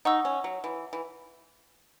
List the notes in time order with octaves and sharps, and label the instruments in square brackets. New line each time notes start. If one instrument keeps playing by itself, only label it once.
[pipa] D#4 [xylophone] F#5 C#6 E6
[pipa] C#4
F#3
E3
E3